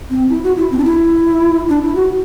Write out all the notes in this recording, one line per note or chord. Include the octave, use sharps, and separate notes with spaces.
C4
E4
F#4
E4
C4
D4
E4
D4
E4
F#4